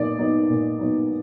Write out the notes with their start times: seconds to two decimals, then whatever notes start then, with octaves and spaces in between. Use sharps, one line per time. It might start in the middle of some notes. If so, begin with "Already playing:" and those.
Already playing: A#2 F#3 B3 D#4 D5
0.19 F#3 B3 D#4
0.50 A#2
0.79 F#3 B3 D#4